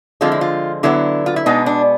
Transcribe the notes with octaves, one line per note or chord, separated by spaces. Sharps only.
D3 F3 G#3 C4 F4
E4
F4
D3 F#3 B3 E4
F4
E4
B2 G#3 B3 D4 D#4
D4